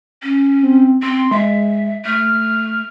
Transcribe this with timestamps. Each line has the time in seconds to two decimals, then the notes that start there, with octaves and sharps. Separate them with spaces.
0.23 C#4
0.63 C4
1.03 C4 C6
1.31 G#3 E5
2.05 A3 F6